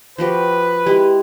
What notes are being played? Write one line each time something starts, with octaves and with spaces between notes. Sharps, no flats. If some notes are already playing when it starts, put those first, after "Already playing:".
F3 F#4 G4 B4
G#3 E4 G4